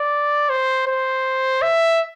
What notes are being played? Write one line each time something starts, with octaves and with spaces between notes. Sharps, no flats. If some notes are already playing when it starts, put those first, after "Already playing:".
Already playing: D5
C5
C5
E5